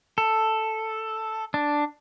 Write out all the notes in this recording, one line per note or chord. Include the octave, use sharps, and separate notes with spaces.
A4
D4